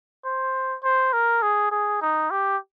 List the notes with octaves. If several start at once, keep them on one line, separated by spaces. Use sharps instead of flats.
C5
C5
A#4
G#4
G#4
D#4
G4